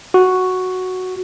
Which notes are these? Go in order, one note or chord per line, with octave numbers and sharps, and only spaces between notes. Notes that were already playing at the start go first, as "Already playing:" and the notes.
F#4